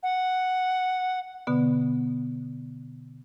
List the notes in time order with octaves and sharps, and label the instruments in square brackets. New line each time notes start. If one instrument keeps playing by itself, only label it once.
[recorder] F#5
[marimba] B2 D3 B3